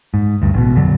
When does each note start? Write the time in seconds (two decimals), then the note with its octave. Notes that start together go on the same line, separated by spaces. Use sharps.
0.14 G#2
0.42 D2 G2
0.54 A1 B2
0.75 A#1 F2 D3 F#3